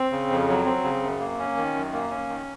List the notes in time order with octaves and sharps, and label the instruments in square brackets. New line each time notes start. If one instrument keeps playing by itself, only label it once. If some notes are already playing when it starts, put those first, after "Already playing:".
Already playing: [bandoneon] C4
C#3
F2
F#3
C4
C#3
F#2
A#3
C#4
D#3
F#2
A#3
C#4
D#3